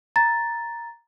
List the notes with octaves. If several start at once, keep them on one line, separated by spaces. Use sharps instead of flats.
A#5 A6